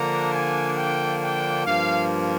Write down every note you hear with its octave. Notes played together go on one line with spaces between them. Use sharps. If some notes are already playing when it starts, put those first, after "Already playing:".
Already playing: D3 F3 A#3 D4 A#5
G#5
G5
G5
G2 F3 A#3 F5